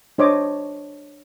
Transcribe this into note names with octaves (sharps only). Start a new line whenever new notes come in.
D4 C5 C#5 D#5 D6